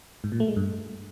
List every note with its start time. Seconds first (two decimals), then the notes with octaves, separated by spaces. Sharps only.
0.24 G#2
0.32 A#2
0.40 A3
0.48 G#3
0.56 G2